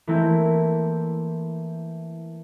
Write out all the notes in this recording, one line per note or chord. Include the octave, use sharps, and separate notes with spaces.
E3 A3 A#3 C4 E4